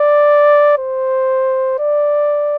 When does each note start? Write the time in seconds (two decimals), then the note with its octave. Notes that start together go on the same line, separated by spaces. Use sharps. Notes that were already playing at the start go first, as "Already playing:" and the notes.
Already playing: D5
0.78 C5
1.79 D5